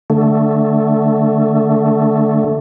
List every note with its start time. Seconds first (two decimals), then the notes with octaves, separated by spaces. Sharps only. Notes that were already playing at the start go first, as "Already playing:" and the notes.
0.10 D3 A3